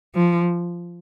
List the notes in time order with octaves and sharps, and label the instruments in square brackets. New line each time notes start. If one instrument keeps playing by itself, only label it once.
[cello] F3